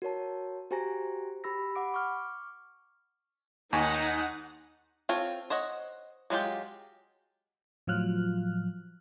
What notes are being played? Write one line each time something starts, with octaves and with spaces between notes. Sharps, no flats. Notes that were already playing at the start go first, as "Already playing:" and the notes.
F#4 A#4 C#5 A5
F#4 G4 C5 G#5 A#5 A#6
G4 B5 E6 A#6
F#5 B5 D6 D7
C#6 D6 F6
D#2 D#4 F#5 G#5 C#6
C4 F4 A4 C#5
C5 C#5 D#5 F#5
F#3 G#3 F4 G4
A2 F3 F#3 F4 F6 F#6